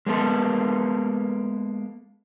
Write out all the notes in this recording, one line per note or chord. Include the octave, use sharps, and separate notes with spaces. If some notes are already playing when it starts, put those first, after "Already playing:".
G#3 A#3 B3 A4